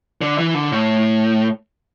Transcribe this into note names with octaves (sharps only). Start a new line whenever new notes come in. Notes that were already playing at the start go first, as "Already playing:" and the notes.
D3
E3
D3
A2